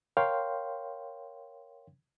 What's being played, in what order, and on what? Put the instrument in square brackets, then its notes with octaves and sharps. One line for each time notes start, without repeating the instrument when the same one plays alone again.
[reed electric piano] A#4 C#5 F5 G5 C6